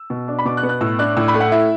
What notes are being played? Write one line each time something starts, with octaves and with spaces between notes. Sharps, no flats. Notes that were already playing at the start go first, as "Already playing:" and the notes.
Already playing: E6
B2
D4
B5
B2 D6
F#6
B3
F#6
A2 E6
D4 F#6
A2 E6
B5
A3
F#5
E4 E5